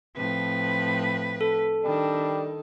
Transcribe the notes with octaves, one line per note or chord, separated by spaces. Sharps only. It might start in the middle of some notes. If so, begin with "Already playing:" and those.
A2 F3 C4 B4
A4
D#3 G3 D4